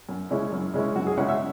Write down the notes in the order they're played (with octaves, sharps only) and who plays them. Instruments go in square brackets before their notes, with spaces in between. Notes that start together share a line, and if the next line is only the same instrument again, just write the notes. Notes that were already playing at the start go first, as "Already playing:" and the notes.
[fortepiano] F#2
C#3 G#3 C#4 E4
F#2
C#3 G#3 C#4 E4
F#2 F#4
G#4
C#3 G#3 C#4 E4 F#5
E5